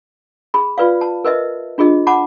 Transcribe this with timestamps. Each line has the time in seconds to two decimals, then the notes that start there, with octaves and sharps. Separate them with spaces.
0.54 G#4 B5
0.78 F4 B4 D5 F5
1.01 A5
1.24 A#4 B4 D#5 E5
1.78 D4 F4 G#4 D#5
2.07 F#5 A5 B5 D6